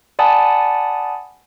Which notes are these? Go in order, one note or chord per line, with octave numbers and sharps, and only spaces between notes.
D5 F#5 G#5 A5 B5 D#6